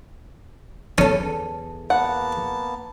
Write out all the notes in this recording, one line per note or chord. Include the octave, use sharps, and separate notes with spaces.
E2 C#4 A4
A#3 B3 F#5 A5